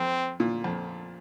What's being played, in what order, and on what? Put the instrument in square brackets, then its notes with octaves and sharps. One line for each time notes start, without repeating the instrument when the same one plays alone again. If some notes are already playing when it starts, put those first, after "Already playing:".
Already playing: [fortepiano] F2 [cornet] C4
[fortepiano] A#2
F2